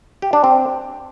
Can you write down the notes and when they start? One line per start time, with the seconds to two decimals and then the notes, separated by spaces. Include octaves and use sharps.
0.22 G4
0.33 D4
0.44 C4